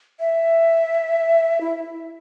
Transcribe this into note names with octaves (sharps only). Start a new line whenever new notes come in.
E5
E4